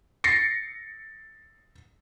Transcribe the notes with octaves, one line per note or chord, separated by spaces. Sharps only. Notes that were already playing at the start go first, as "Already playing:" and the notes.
A6 A#6 C7 C#7